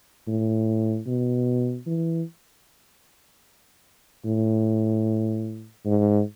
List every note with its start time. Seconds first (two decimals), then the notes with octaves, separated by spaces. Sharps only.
0.27 A2
1.06 B2
1.86 E3
4.25 A2
5.85 G#2